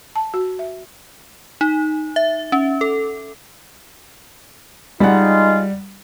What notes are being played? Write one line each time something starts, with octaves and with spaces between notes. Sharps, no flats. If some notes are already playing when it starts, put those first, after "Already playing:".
A5
F#4
E5
D#4
E5
C#4
A4
G3 G#3 D#4 F4 F#5